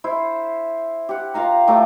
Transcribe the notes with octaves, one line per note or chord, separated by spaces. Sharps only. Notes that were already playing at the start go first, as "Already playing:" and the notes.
E4 C5
G4 F#5
F4 A#4 F5 A#5
A2 A3 A#5 D6